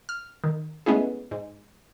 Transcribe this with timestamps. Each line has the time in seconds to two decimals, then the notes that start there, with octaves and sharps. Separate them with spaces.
0.09 F6
0.44 D#3
0.86 G#3 A3 B3 C#4 E4 G#4
1.31 G#2